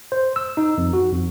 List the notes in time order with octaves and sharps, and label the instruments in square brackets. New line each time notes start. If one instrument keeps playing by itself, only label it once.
[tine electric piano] C5
E6
D#4
F2
F#4
F2